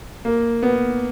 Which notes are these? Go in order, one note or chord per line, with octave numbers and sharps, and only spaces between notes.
A#3
B3